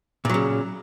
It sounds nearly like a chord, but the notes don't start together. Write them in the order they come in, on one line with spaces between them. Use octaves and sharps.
A#2 F#3 C#3